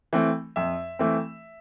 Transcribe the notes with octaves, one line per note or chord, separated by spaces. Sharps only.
E3 A3 C4
F2 E5
E3 A3 C4